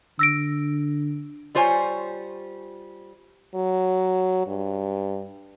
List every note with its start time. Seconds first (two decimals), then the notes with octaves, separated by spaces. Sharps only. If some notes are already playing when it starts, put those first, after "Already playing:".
0.19 D3 E6 A#6 D7
1.55 G3 F4 C5 C#5 G#5
3.54 F#3
4.47 G2